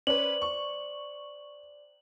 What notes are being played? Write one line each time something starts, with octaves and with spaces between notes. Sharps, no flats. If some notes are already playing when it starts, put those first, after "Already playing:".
C#4 B4 C5 D5 F#7
C#6